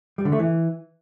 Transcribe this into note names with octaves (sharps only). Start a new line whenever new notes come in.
G3
D3
A3
E3